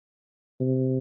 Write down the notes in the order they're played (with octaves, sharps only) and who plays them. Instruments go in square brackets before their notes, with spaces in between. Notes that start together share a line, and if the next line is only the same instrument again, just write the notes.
[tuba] C3